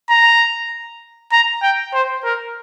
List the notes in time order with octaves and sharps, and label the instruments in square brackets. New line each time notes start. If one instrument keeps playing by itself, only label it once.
[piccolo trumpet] A#5
A#5
G5
C5
A#4